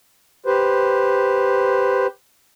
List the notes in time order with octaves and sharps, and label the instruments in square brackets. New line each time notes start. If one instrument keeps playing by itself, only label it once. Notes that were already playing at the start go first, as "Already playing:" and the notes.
[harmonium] G4 B4 C5